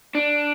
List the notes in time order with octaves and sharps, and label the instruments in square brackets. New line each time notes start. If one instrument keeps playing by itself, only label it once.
[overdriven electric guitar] D4